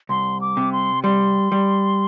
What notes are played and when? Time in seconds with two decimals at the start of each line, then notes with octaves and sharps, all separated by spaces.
0.09 C2 C6
0.41 D6
0.57 C3
0.72 C6
1.04 G3 C6
1.52 G3